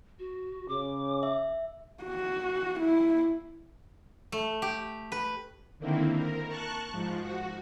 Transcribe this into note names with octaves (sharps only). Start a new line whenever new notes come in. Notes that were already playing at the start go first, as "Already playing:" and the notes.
F#4
C#3 D6
E5
F#4
E4
A3
G4
B4
D3 D#3 A#3 C4 E4
A#4
A5 C#6 F#6
G#2 F3
F#4